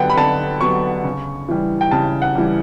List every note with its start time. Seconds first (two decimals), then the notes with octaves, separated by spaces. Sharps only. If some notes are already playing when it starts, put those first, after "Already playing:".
Already playing: D3 F#3 B3 F#5 G5
0.10 B5
0.17 D3 A5
0.61 F#3 B3 C#6
1.04 C#3
1.49 E3 G3
1.81 G5
1.91 C#3 A5
2.22 F#5
2.35 E3 G3